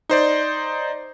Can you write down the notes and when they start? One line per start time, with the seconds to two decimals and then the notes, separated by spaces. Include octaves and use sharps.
0.09 D#4 C5 D5